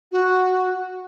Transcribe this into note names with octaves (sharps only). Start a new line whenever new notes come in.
F#4